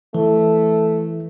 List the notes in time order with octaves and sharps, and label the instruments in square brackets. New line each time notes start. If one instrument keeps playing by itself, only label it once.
[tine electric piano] E3 [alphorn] A3